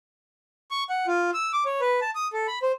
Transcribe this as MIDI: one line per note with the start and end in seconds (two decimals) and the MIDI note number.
0.71 0.84 85
0.90 1.06 78
1.07 1.31 65
1.34 1.52 88
1.53 1.64 86
1.65 1.81 73
1.81 2.00 71
2.01 2.10 81
2.15 2.28 87
2.33 2.47 69
2.48 2.59 83
2.62 2.72 72